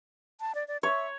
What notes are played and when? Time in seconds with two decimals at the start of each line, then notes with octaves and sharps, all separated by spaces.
0.41 A5
0.55 D5
0.68 D5
0.83 C#5 E5